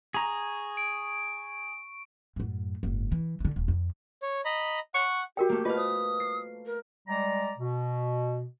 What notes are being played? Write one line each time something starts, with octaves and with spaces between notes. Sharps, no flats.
G#4 A#5 C#6
D7
F#2 A2
F#1 G#2
E3
D3 E3
D#1
F2
C#5
D#5 A#5 B5
F#5 C#6
F#4 G4 A#4 G5
A3 A#3
F4 B4 D#5 F5
C5 D#6
C7
A#4
G3 G#3 D5 A#5
B2